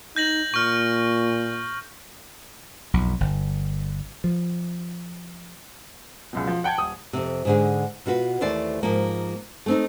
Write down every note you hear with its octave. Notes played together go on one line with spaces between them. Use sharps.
D#4 G6 A#6 F#7
A#2 C#6 F6
B1 F2
G1
F3
C#2 F#2 B2
F3
F#5 G5 A5 G#6
D#1 D#6
F2 C3
G#2 D3 G#4
B2 F4 F#4 B4
D#2 E3 A3 C5 D5
G#2 F3 A#3
A3 C4 D#4